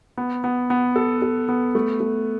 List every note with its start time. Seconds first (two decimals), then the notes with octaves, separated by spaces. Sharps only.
0.17 B3
0.44 B3
0.70 B3
0.96 A4
1.22 A4
1.49 B3
1.75 A3
2.00 A3